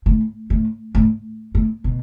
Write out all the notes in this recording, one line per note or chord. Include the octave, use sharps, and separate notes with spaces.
A2
A2
A2
A2
B2